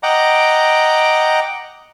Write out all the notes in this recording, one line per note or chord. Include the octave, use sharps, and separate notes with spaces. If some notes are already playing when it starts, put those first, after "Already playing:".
D#5 F#5 G5 A#5 D6